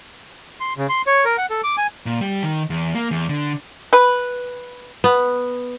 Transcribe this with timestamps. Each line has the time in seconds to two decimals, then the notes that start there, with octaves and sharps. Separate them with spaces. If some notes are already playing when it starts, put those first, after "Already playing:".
0.60 C6
0.77 C#3
0.89 C6
1.07 C#5
1.25 A#4
1.38 F#5
1.50 A4
1.64 D6
1.78 G#5
2.06 A#2
2.21 G3
2.43 D#3
2.70 E2
2.95 A#3
3.11 E2
3.29 D3
3.93 B4
5.04 B3